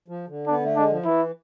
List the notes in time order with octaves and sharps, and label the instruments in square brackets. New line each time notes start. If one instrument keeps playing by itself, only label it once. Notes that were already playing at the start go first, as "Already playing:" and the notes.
[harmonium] F3
D3
[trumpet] D4
[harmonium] B3
A3
[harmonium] G#3 [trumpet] D4
[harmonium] F3
[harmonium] E3 [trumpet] E4